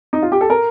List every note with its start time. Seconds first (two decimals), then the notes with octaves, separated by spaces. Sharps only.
0.13 D#4
0.22 F4
0.32 G4
0.41 A4
0.50 A#4